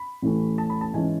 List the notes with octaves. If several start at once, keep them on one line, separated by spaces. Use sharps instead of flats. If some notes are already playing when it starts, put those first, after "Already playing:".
Already playing: B5
A1 A2 E3 A3 C#4
A5
B5
A5
G#2 E3 G#3 C#4 G#5